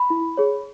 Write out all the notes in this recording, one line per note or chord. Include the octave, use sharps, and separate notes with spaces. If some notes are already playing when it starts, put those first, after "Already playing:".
Already playing: B5
E4
G#4 C#5